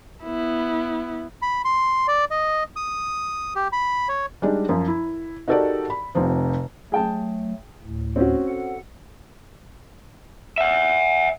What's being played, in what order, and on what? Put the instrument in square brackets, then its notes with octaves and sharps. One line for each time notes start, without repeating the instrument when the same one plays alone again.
[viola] B3 E4
[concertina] B5
C6
D5
D#5
D#6
G4
B5
C#5
[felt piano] G3 G#3 D4 D#4
F#2 F3
E4
D#4 F#4 G4 A4 A#4 D5
B5
F1 C3 F3 C5
[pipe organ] F#3 A3 [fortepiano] G#4 G5 A5
[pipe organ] D2 A2
[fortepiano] C4 C#4 F#4
[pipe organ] A4 F#5
[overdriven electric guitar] E5 F#5